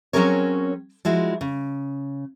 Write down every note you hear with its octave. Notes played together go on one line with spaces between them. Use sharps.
F#3 C4 C#4 G#4 A#4 C#5
F3 G#3 E4 F#4
C#3